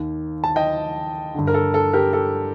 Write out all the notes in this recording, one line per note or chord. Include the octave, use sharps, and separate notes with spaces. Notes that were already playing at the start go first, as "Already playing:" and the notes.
Already playing: D#2 D#3
A5
D#5 G5
G2 D3
A#4
A4
A4
G4 A#4
A4